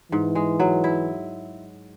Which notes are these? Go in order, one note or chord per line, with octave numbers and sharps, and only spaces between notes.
G#2 E3
G#3
F#3
E4